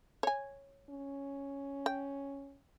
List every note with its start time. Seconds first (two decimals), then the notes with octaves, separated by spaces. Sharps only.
0.23 C#5 G#5
0.90 C#4
1.86 G5